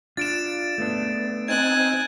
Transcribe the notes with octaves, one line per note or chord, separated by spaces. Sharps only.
D4 F4 A6 D7 E7
A3 B3 D4
C4 D#4 G#5 F#6 G#6